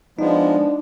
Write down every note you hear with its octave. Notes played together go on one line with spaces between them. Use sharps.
F3 G#3 B3 D4 D#4